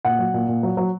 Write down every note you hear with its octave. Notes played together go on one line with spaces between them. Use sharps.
A#2 F#5
F#3
A#2
A#2
F#3
F#3